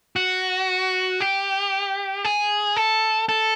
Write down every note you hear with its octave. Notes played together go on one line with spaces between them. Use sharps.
F#4
G4
G#4
A4
A4